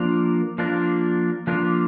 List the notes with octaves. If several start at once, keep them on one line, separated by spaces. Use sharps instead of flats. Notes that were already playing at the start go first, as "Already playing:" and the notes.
Already playing: F3 A#3 D4 F4 A#4
F3 A#3 D4 F4 A#4
F3 A#3 D4 F4 A#4